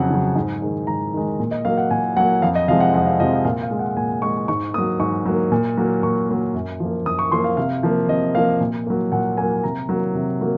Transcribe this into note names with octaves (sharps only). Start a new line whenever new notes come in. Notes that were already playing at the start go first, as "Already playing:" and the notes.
Already playing: F2 C#3 F#3 F#5
C#3 F#3
G#2
D#3 G#3
G#2 A#5
D#3 G#3
A#2
D#5
F#3 A#3 F5
F#5
A#2 G#5
F#3 A#3 F#5
F2 F5
D#5
C3 F3 G#3 F5
F#5
F2 F#5
F5
C3 F3 G#3 D#5
F5
A#2 F5
F5
G#3
F#5
A#2 G#5
G#3 C#6
G#2 C#6
F#3 A#3 D#6
G#2 C#6
F#3 A#3
A#2
F#3 A#3
A#2 C#6
F#3 A#3
F#2
F3 A#3
F#2 D#6
C#6
F3 A#3 C6
F5
C3 F5
F3 A#3
C3 D#5
F3 A#3 F5
A#2
F#3 A#3
A#2 F#5
F#3 A#3 G#5
C3 A#5
F#3 A#3
C3
F#3 A#3